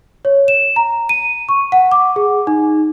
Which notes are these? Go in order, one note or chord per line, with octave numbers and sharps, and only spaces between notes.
C#5
E7
A#5
D#7
C#6
F#5
D6
G#4
D#4